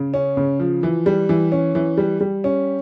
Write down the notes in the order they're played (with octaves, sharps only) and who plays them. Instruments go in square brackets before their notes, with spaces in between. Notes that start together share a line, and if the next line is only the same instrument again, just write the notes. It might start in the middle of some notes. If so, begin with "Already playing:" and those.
Already playing: [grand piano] C#3
C#4
C#3
F3
E3
G3
E3
C#4
E3
G3
G3
C#4